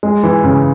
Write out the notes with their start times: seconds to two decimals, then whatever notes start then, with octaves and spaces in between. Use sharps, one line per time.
0.03 G#3
0.23 E3
0.44 C#3